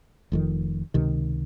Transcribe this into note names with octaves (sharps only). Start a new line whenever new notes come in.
F1 F2 D#3
C#2 C3 D#3